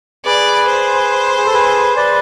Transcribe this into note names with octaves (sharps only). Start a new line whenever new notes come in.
G#4 B4 D5
C5
G#4
A4
G#4 B4
B4 D5